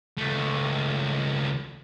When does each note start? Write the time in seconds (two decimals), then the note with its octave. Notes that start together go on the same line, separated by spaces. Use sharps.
0.18 C#2 A3